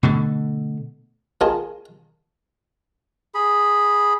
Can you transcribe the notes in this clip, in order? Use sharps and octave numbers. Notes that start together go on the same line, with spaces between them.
B2 D3 A3
A#3 F4 G#4 D#5 G#5 A5
G#4 B5